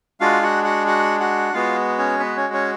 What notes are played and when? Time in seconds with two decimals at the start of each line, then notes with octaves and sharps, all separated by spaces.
0.20 G#3 D4 F4 F#4 F5
0.43 F#4 F#5
0.65 F#4 F#5
0.87 F#4 F#5
1.20 F#4 F#5
1.53 G#3 B3 F4 F#4 F5
1.98 C#4 C#5
2.19 B3 B4
2.37 C#4 C#5
2.53 C#4 C#5